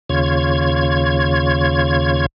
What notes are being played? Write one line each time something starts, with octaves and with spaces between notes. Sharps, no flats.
D#2 C#3 F4 C#5 G#6